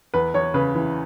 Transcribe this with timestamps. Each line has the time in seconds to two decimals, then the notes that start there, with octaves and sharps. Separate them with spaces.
0.14 E2 B4
0.34 E2 C#5
0.54 C#3 B4
0.75 E3